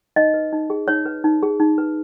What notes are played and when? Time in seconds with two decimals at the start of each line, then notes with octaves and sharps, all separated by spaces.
0.16 D#4 D#5
0.34 B4
0.53 D#4
0.70 G#4
0.88 D#4 C#5
1.06 B4
1.24 D#4
1.43 G#4
1.60 D#4
1.78 B4